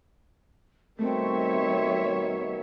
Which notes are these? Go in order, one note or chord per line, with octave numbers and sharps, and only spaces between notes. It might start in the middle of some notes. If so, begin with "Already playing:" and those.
B2 D#3 G3 A3 C4 C#5 E5